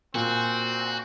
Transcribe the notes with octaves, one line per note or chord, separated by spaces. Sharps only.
A#2 C4 F#4 G#5